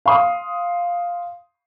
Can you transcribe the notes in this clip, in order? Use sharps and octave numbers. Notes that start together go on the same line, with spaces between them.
F5 C6 D#6